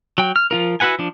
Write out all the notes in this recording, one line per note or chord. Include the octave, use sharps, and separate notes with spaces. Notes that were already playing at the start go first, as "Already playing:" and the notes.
F#3 G5
F6
F3 F4 A#4
E4 F#4 B4 F#5 G#5
F3 D4